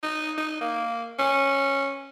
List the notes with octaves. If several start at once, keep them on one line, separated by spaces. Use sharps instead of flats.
D#4
D#4
A#3
C#4